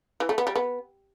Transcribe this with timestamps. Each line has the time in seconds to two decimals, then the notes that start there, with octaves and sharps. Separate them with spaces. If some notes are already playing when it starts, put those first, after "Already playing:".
0.20 E3
0.29 A3
0.38 B3
0.47 G3
0.56 B3